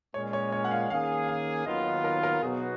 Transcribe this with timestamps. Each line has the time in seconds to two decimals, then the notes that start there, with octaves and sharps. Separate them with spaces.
0.14 A#2 G#3 C#4 C#5
0.33 C#5
0.52 C#5
0.64 F#5
0.71 F5
0.90 D#3 A#3 C#4 G#4 F5
1.28 F5
1.66 D#2 D#3 F#3 B3 F4 D#5
2.04 A#4
2.23 A#4
2.42 B2 F#3 B3 D#4 F#4 G#4